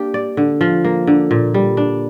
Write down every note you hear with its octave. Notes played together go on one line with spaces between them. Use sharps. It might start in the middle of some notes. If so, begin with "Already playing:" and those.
Already playing: A#3 D4 G4
D5
D3
F3
A#3
D3
A#2
G3
D4